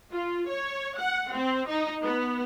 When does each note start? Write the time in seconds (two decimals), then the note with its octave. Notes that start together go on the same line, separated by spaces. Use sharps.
0.12 F4
0.50 C#5
1.00 F#5
1.34 C4
1.68 D#4
2.03 B3